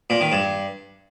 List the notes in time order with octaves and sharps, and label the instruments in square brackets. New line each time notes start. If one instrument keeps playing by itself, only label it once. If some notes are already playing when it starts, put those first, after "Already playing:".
[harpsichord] A#2
D#3
G2